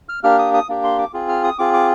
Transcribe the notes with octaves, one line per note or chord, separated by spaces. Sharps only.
F6
A#3 D4 G4 F6
D#6
D#6
A#3 D4 G4
C6
D6
C4 F4 G#4
F6
D#6
C4 F4 G#4 D6
D6